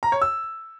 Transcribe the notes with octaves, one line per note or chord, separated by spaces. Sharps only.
A#5
C#5
E6